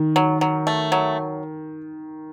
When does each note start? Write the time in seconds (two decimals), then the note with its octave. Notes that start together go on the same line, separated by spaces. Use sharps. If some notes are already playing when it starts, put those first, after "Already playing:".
Already playing: D#3
0.16 F#3
0.41 F#3
0.67 A3
0.92 F#3